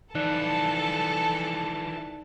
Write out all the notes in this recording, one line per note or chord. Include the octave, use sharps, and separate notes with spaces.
E3 F3 D#4 A4 D5 A5 F#6